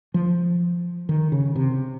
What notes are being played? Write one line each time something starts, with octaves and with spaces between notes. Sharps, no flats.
F3
D#3
C#3
C3